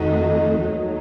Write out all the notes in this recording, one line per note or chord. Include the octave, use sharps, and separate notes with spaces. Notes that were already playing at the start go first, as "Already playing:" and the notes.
Already playing: F2 D#3 A3 D#4 F#4
D#2 D#3 F#3 A3 D#4